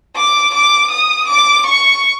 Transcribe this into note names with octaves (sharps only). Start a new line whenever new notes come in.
D6
D6
D#6
D6
C#6